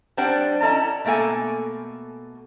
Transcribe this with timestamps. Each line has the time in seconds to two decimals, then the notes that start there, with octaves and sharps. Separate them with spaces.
0.17 G3 C4 D4 C5 D5 F#5
0.62 C#4 E4 A4 D#5 A5 A#5
1.05 B2 A3 A#3 A4 G#5